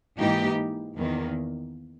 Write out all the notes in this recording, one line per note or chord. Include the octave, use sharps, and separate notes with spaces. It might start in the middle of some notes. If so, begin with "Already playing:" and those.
G#2 E3 A#3 D#4 G4
E2 D#3 A#3